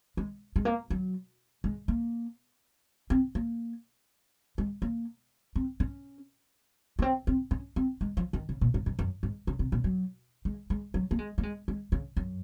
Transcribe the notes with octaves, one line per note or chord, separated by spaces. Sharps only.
G#3
G#3
A#3
F#3
G#3
A#3
C4
A#3
G#3
A#3
C4
C#4
A#3
C4
C4
C#4
C4
G#3
F3
D#3
C#3
A#2
G#2
F#2
F#2
G#2
C#3
C3
A#2
F#3
G#3
G#3
F#3
A#3
G#3
A#3
G#3
G#3
C#3
F#2